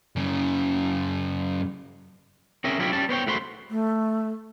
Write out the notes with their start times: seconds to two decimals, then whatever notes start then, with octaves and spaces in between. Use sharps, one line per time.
0.16 F#2 C#3
2.64 C4 C#4 G#4 A#4 E5 G#5
2.79 F#3 D4 E4 F4 G4
2.93 G3 C#4 G4 A5
3.09 B3 C5 C#5 G5
3.27 E2 A3 F#4 C5 B5 C6
3.70 A3